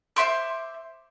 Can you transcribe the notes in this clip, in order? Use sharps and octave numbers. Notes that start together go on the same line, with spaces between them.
C5 E5 C6 D6